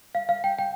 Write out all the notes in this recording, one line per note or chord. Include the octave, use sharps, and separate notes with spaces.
F5
F5
G5
G5